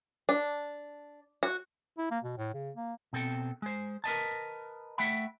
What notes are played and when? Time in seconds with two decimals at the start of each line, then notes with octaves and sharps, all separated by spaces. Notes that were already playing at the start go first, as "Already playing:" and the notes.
0.29 D4
1.43 F#4
1.98 E4
2.11 A#3
2.24 B2
2.38 A2
2.54 C#3
2.76 A#3
3.13 B2 C4 A4 G5
3.62 G#3 C5
4.04 A#4 B4 D#5 A5
4.98 A3 E5 F#5 G5 B5